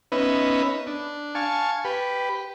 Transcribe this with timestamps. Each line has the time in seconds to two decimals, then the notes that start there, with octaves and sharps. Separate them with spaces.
0.12 B3 C#4 D#4 B4 E5
0.87 D4
1.35 F5 G#5 A5 C#6
1.85 G4 B4